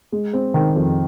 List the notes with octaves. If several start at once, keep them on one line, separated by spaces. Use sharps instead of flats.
G#3
C4
D#3
F2